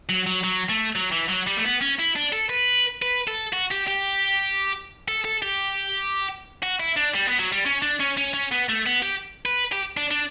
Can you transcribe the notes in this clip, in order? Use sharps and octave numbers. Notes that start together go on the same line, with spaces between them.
F#3
F#3
F#3
A3
F#3
E3
F#3
G3
A3
B3
C#4
E4
D4
A4
B4
B4
A4
F#4
G4
G4
A4
A4
G4
F#4
E4
D4
G3
B3
F#3
G3
C#4
D4
C#4
C#4
C#4
B3
A3
B3
G4
B4
G4
D4
D4